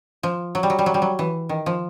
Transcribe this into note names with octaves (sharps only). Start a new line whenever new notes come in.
F3
F#3
G3
F#3
G3
F#3
G3
F#3
E3
D#3
F3